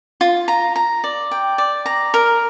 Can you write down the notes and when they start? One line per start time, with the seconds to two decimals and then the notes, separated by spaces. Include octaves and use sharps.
0.21 F4
0.48 A#5
0.76 A#5
1.04 D5
1.31 G5
1.58 D5
1.86 A#5
2.14 A#4